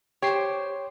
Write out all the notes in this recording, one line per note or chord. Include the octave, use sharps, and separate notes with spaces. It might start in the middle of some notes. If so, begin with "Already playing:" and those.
G4 C5 C#5 C7